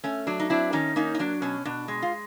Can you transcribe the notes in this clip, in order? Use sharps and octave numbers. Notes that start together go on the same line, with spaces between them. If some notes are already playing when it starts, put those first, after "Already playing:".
A3 C#4
F#3 D4
D#4
C4 D4 E4
D#3 C#4 D#4
A#3 C#4 D#4
D#4
F#3 D4
B2 C#4
B2 D4
G#3
F4